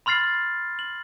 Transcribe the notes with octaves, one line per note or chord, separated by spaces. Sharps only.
B5 C6 F6 A6 C7
F#7